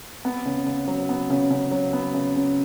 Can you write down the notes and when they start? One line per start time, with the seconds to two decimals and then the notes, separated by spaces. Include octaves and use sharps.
0.25 B3
0.45 C#3
0.66 C#3
0.88 F#3
1.09 B3
1.30 C#3
1.51 C#3
1.71 F#3
1.93 B3
2.14 C#3
2.36 C#3